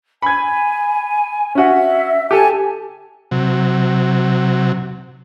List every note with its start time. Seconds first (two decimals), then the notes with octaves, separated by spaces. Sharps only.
0.22 G#5 B5 G#6
1.55 C#4 F#4 E5
2.31 G4 A4 G#5 A5
3.31 C3 F#3